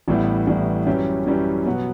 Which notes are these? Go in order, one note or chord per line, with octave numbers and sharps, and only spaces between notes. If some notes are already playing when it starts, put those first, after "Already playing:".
A1 A2 G3 B3 E4
A1 A2 G3 B3 E4
F#2 E3 G3 C#4 G4
F#2 E3 G3 C#4 G4
B2 F#3 B3